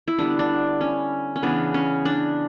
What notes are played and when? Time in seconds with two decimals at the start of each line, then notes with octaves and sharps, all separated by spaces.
0.08 E4
0.18 D3 G3 B3 D4
0.39 D4
0.81 C#4
1.36 C#4
1.43 C#3 E3 B3 D4
1.74 C#4
2.05 D4